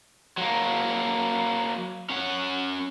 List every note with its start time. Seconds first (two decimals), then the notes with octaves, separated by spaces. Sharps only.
0.38 F#3 A#3
2.09 C#4 F#5